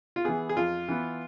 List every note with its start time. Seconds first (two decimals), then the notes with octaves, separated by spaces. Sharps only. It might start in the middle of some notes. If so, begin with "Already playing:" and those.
0.16 F4
0.24 E3 B3 G#4
0.49 G#4
0.56 F2 F4
0.89 E3 B3